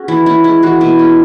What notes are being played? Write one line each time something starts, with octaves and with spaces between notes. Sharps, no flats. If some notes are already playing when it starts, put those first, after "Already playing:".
Already playing: C#4 F#4 G#4
E3 E4
C#4 E4
G#3 E4
E3 F#4
B2 E4
C#4